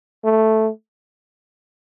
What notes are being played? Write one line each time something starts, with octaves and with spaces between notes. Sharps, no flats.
A3